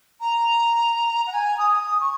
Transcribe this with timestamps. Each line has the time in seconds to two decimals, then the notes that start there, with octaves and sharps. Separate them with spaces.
0.20 A#5
1.26 F#5
1.32 G#5
1.58 D#6
1.83 D#6
2.00 C#6